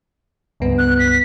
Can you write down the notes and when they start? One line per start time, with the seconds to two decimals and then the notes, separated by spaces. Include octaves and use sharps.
0.60 C#2 G2 B3
0.78 F#6
0.99 B6